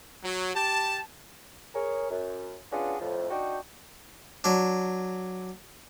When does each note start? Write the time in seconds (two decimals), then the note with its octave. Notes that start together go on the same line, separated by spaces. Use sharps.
0.24 F#3
0.55 G4 A5
1.74 G#4 A#4 C#5
2.10 F#2
2.71 B3 C#4 D4 F4 F#4 G#4
3.00 F2 A2 F3
3.30 D4 D#4 F#4 G5
4.44 F#3 D4